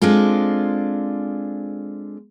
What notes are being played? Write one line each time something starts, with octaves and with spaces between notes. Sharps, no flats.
G#3 C4 D4 F4 A4